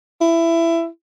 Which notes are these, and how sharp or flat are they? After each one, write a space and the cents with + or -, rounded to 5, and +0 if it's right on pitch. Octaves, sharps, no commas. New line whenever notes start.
E4 +15